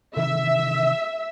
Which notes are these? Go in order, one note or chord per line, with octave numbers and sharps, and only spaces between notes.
C3 D#3 E3 E5